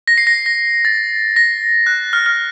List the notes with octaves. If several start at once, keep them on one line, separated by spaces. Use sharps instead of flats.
A#6
C7
A#6
A#6
A6
A#6
F#6
F6
F6